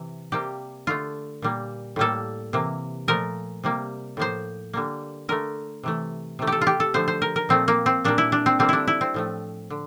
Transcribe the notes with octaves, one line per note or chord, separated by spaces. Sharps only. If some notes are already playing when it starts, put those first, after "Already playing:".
Already playing: C3 E3
C3 G3 A#3 G4
D3 A3 F4
A#2 G3 A#3
A2 G3 A#3 A4
C3 E3 A#3
A#2 F3 A3 A#4
C3 G3 A#3
A2 F3 A#3 C5
D3 G3 A#3
D3 A3 A#4
C3 E3 A3
C3 E3 A3
G4 A4
F4
G4
A4
D3 F3 A3 C5
C5
A#4
A#4
A#2 F3 A3 C4
A#3
C4
A#2 G3 A#3 D4
E4
D4
C4
D3 G3 A#3 C4
D4 E4
E4
C4
A2 F3 A3
D3